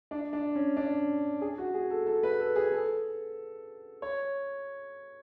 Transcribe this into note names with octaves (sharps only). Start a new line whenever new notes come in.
D4
D4
C#4
D4
G#4
F#4
G#4
A4
A4
B4
A4
G#4
A4
C#5